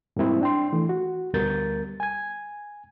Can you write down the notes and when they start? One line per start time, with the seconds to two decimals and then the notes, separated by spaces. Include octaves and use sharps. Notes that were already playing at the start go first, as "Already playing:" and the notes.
0.16 G#2 G3 A#3 C4 E4
0.41 D4 G5 C6
0.73 E3 A3
0.89 F#4
1.34 D2 G3 B3 A#4 G6 A6
2.00 G#5 G#6